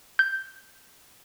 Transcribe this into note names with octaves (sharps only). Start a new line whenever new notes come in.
G6